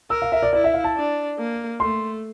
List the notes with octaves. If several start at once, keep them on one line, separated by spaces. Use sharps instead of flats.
A#4 E6
F5
E5
D5
E4 D5
E5
F5
A5
D4
A#3
A3 C6